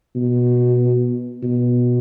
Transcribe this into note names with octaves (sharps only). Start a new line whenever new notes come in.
B2
B2